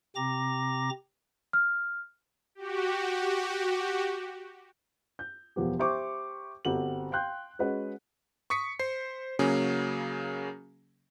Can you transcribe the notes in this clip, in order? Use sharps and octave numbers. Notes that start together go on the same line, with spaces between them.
C3 C4 A#5 D6 A#6
F6
F#4 G4
G6
E1 F3 B3 G4
G4 C5 E5 G5 C#6 D6
G1 C4 F#4 G4 F#7
F5 G5 C6 F#6 G6
G#3 C#4 F#4 B4 D#5 F#5
C#6 D#6 B6 C#7
C5 C7
C#3 F#3 A#3 C#4 G#4